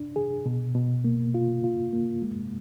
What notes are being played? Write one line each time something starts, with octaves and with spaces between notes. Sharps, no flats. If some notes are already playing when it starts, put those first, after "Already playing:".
Already playing: D4
G#4
B2
B2
A#3
F4
F4
A#3
G#3